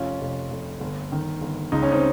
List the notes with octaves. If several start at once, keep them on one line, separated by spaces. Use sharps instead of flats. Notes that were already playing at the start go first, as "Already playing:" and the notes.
Already playing: F1 C#4 F4
F1
F1
G1
D#3
G1
C#2 D#4
C#4
C4 D#4